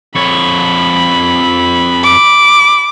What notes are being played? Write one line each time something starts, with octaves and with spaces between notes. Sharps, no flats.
F2 C#5 B5
D6